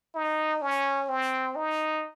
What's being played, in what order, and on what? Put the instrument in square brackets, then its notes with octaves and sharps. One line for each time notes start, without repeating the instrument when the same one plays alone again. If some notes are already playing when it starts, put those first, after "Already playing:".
[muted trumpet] D#4
C#4
C4
D#4